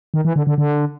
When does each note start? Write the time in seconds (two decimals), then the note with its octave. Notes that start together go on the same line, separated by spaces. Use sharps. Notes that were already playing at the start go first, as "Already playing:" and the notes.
0.14 D#3
0.25 E3
0.36 D3
0.47 D3
0.58 D3